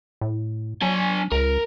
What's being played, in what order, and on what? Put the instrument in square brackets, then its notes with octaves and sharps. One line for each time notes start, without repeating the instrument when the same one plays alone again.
[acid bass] A2
[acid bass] F#3 [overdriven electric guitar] D4 G#5
[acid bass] C#2 [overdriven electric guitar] A#4